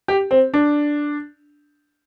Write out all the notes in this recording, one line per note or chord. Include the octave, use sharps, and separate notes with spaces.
G4
C4
D4